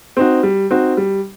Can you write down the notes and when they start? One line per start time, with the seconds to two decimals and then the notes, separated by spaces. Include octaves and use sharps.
0.17 C4 D#4 F#4
0.43 G3
0.70 C4 D#4 F#4
0.97 G3